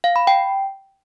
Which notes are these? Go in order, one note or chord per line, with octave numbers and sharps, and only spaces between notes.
F5
B5
G5